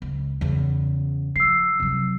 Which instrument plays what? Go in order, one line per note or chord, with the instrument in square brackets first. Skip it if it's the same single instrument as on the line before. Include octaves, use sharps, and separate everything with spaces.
[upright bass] C#2
E2 C#3
[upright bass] F3 [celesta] E6 C7
[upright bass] C3 F#3